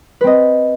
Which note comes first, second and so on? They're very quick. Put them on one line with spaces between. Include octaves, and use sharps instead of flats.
B4 C4 D#5